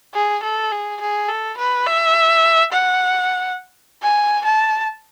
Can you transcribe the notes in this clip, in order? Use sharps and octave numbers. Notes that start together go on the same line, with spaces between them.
G#4
A4
G#4
G#4
A4
B4
E5
F#5
G#5
A5